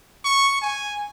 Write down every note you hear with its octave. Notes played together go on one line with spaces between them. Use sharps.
C#6
G#5